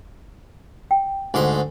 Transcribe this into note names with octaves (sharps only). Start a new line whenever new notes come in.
G5
D2 G#2 G#5 C6